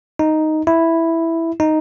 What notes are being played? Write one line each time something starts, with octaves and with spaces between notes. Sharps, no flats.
D#4
E4
D#4